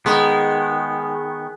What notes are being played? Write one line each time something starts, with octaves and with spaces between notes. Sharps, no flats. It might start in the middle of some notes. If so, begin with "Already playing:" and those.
D#3 G#3 B3